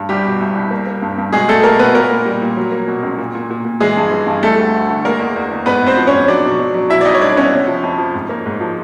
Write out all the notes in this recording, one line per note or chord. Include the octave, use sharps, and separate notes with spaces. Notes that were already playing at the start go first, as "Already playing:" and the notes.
Already playing: G2
C2 G3 G4
B2
C2
C2
A#3
A#3
G2
G2
B2 G#3 G#4
B2 A3 A4
B2 A#3 A#4
B2 B3 B4
A#2 A#3 A#4
A#2
G3
A#2
F#3
A#3
B2
C#2
A#2
A#2
A#2
A#2
E3 G#3 G#4
G2
E3
G2
G3 A3 A4
D2
D2
D3
G#3 A#3 A#4
E2
E2
E2
G#2 B3 B4
G#2
C4 C5
F3
C#4 C#5
G#2
F#3 D4 D5
B2
F#3
F#3
B2 E4 E5
D5
C2 D#4 D#5
C#5
C2 D4 D5
B3 C#4 C#5
C3
F3
F2
F3
G#2
A#3
G#2
F3